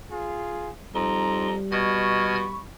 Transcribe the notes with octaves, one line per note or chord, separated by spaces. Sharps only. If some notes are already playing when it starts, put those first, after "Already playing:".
F4 G#4
F2 G3 D#4 A#5 C6
B2 D#5 B5 C#6 F6 G#6